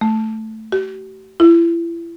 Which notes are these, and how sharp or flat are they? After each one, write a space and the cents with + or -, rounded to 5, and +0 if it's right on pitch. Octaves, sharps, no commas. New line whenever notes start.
A3 +0
G4 -40
E4 +35